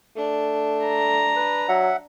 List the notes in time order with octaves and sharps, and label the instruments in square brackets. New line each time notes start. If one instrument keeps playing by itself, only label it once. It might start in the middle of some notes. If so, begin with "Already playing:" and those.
[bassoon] A3 [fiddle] D4
[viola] A#5
[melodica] B4
[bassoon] F#3 [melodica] E5 F#5